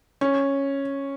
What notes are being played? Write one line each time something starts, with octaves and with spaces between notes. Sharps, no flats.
C#4